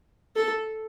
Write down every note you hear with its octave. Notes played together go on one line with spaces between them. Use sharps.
A4